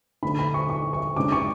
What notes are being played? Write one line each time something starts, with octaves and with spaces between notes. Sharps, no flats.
D3 A3 D4 B5
B5
C#6
C#6
C#6
C#3 G#3 D4 D6
C#6